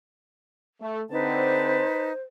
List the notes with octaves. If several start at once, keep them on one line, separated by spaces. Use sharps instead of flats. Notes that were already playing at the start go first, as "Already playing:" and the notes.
A3
D3 C4 D#4 B4 C5 A5